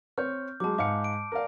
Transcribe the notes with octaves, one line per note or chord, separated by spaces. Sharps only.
C4 C#5 F6 G6
F#3 G#3 A5 D6
G#2 F5 D6 C#7
D7
A#4 D5 F5